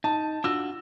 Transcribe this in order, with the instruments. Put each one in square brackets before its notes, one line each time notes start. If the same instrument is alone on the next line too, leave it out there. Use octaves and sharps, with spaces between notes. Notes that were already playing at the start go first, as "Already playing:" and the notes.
[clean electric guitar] D#4 [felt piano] A5
[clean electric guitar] D4 F4 F#4 [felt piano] E6